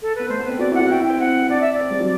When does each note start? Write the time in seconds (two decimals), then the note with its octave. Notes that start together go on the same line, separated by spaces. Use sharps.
0.02 A4
0.15 B3 B4
0.29 A3 C5
0.39 B3
0.44 C4 B4
0.59 F#4 D5
0.70 E4
0.75 F#4 F#5
0.89 E4 G5
1.00 E4
1.05 G5
1.10 C4
1.20 F#5
1.42 C4
1.49 D4 D5
1.61 E5
1.73 D5
1.80 C4
1.90 G3
2.00 F#3